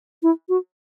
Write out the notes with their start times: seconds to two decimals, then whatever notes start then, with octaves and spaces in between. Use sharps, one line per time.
0.23 E4
0.49 F#4